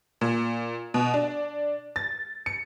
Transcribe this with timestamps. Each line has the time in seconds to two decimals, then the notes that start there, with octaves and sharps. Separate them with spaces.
0.21 A#2
0.94 B2
1.14 D4
1.96 A6
2.46 C#7